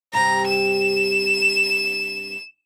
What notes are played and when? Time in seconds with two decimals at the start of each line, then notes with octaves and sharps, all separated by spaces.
0.13 G2 C3 C4 A#5
0.47 E7